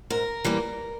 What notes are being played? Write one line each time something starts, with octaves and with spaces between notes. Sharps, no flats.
G#2 A#4
E3 G3 A#3